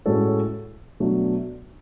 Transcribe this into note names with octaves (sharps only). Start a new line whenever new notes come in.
A2 G#3 C#4 F#4 A4
B2 F#3 A3 D4